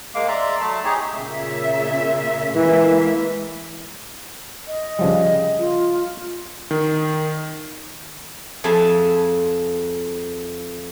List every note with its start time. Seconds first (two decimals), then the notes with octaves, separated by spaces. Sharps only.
0.15 G#3 A#3 F5 D6
0.28 D5 E5 A#5 C6
0.60 F#3 A3 A5
0.84 D#4 G4 G#4 C#5
1.14 A#2 C#3 E5
2.55 E3 G#3 A#3 E5
4.68 D#5
4.99 C#3 F3 G3
5.59 F4
6.71 D#3
8.64 F2 G#4 E5 A5 C6